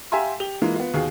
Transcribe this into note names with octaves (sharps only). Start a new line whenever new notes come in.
G4 E5 F5 G#5 A#5 C6
G4 F7 G7
E3 G#3 A#3 F4
B3 F4
D#2 B2 G#4 F5 C7